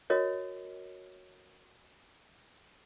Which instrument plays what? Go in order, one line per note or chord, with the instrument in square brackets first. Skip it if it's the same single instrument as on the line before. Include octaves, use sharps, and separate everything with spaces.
[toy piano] F#4 A#4 C#5 D#5